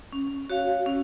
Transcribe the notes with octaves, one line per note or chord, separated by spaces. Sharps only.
C#4
F#4 C#5 F5
C#4